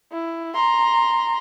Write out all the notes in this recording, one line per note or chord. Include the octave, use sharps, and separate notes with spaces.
E4
A#5 C6